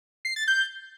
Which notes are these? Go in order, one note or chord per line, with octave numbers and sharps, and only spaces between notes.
C7
A6
G6